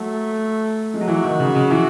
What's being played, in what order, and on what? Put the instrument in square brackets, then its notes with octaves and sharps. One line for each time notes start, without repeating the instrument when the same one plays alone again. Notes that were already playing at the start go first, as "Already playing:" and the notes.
Already playing: [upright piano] F#3 [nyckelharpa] A3
[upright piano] G#3
F#3
[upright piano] E3 [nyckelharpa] F#4
[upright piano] D#3
C#3
C#3
E3